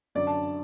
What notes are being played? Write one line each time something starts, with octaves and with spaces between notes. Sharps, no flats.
F#2 D3 F#3 D5
A5